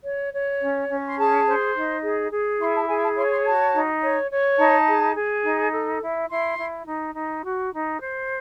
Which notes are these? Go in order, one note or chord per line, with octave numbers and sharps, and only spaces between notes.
C#5
C#5
C#4
C#4
C6
G#4 A5
C5
D#4
G#4
G#4
E4 C6
A5
G#4 G#5
A5
C#5 C6
C6
F#4 A5
D#4
C#5
C#5
D#4 A5
G#4
G#4
D#4
A4
E4
E4 C6
E4
D#4
D#4
F#4
D#4
C5